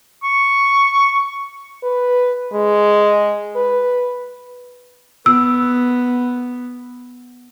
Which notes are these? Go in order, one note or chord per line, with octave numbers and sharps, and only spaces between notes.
C#6
B4
G#3
B4
B3 E6